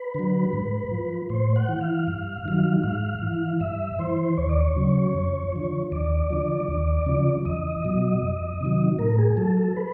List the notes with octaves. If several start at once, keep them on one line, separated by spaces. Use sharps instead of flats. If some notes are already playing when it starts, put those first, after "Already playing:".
Already playing: B4
D3 F#3
G#2
F3
A2 C5
F#5
E3
F5
G2
D#3 F#3
G#2 F5
E3
G2 E5
E3 C5
D#2 C#5
D5
C#5
C#3 F#3
F2
D3 F3
D#2 D5
D3 F3
D#2
C#3 F3
E2 D#5
B2 F#3
F2
C3 D#3 F#3
A2 A#4
G#4
F#3 A4
A4
B4